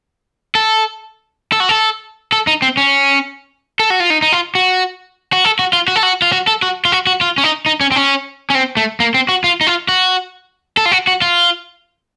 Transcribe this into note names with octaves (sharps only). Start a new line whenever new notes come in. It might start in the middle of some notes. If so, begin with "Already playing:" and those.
A4
A4
F#4
A4
A4
D#4
C4
C#4
A4
F#4
F4
D#4
D#4
F4
F#4
F#4
A4
F#4
F4
F#4
A4
F#4
F4
F#4
A4
F#4
F4
F#4
F#4
F4
C#4
D#4
D#4
C#4
C4
C#4
C#4
C4
A3
A#3
C4
F#4
F4
D#4
F4
F#4
A4
F4
F#4
F#4
F4